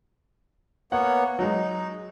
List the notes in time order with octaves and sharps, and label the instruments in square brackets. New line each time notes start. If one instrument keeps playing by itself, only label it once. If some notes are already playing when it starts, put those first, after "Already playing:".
[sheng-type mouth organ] A#3 B3 C#5 [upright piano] F#5
[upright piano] F#3 G#3 [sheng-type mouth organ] D#4